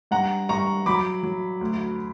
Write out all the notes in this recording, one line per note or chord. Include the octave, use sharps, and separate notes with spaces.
G2 F#5 A#5
G2 A#5 C#6
F#3 B5 D6
F#3
D2